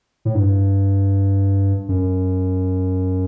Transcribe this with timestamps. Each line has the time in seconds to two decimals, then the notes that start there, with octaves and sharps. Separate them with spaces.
0.25 A2
0.35 G2
1.89 F#2